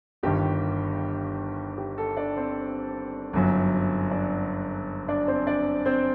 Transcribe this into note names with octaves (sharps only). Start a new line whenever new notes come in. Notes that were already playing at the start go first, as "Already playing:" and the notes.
G1 G2 D#3 G4
G4
A4
D4 D5
C4 C5
G1 F#2 F#3
D4 D5
D4 D5
C4 C5
D4 D5
C4 C5